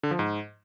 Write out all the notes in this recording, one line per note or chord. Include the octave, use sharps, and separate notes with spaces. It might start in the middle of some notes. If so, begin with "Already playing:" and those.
D3
F3
G#2